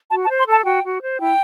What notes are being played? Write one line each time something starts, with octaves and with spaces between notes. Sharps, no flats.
F#4 A5
A5
C5
C6
A4 A5
F#4 G5
F#4
C5
E4 G5